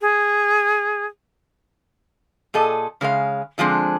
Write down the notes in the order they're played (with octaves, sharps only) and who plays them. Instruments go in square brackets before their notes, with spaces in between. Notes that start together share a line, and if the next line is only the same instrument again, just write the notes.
[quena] G#4
[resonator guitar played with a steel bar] A#2 G#4 A4 D#5
C#3 G#3 C5 F5
D3 F3 G#3 C4 D4